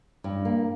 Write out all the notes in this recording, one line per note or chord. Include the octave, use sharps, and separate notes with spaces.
G2
A#3